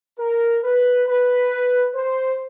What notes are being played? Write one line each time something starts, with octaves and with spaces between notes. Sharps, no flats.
A#4
B4
B4
C5